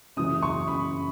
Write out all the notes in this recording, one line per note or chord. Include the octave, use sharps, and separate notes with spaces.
F#1 F#2 C#3 E3 D#6
C#6
B5